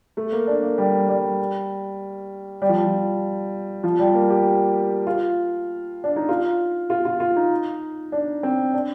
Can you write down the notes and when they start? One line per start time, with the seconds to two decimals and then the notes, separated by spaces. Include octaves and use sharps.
0.17 A3
0.32 A#3
0.47 D4
0.63 A#3
0.78 G3
1.09 G3
2.62 G3
2.69 F3
2.85 F3
3.84 F3
3.99 G3
4.14 A#3
4.30 G4
5.07 F4
6.04 D4
6.16 D#4
6.29 F4
6.90 F4
7.05 F4
7.20 F4
7.36 D#4
8.12 D4
8.43 C4
8.74 D4